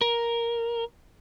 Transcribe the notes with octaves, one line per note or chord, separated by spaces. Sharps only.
A#4